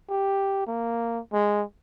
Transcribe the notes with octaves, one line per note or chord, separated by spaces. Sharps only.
G4
A#3
G#3